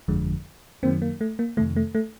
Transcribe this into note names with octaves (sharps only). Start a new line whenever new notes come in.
G1 F2 D3 F3 G#3
F#2 D#3 F#3 A#3 C4
A#3
A3
A#3
F2 C3 D#3 A3
A3
A3